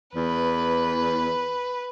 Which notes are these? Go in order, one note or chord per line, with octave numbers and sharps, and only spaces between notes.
E2 B4